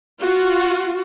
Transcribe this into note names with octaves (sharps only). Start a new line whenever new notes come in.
F4 F#4